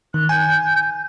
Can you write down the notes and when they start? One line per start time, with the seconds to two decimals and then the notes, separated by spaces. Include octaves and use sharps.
0.14 D#3 F#6
0.29 G#5 G6